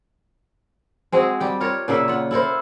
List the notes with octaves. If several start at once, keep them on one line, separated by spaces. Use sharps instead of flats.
G#3 C4 F#4 G#4
G3 G4 G5
F4 A#4 C#5
A#2 C#3 A#3 E5
F4 F#5
E4 A4 A#4 C5